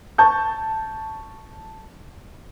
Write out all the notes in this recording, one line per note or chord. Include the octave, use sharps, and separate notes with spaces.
A5 C#6 G6